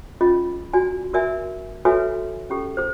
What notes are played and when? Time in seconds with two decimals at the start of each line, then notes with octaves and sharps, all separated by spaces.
0.21 C#4 F4 G#4 D#5
0.73 F#4 D5 G#5
1.14 F#4 A#4 D5 E5 G#5
1.85 F#4 A4 B4 C#5 E5 G#5
2.50 C#4 G4 A4
2.77 G#4 C5